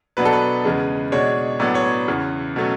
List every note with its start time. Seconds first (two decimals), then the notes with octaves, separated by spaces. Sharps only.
0.17 B2 F#3 B3 D4 B4
0.25 A4
0.33 B4
0.65 E2 C#3 G#3
1.12 B2 G#3 D4 C#5
1.60 A2 F#3 B3 D4 D5
1.75 C#5
2.08 E2 C#3 E3
2.56 B2 F#3 A3 C#4